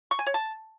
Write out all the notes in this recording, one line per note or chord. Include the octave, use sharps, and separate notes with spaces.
C#6
G#5
C#5
A5